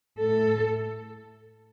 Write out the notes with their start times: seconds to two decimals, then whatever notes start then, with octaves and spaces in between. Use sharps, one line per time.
0.21 A2 A3 A4